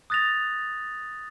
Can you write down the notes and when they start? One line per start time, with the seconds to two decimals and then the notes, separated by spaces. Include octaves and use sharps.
0.10 D#6 F#6 A6 A#6 F7